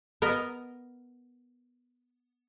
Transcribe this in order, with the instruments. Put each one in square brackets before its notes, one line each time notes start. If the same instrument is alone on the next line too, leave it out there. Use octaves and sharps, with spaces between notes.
[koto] B3 A#4 D#5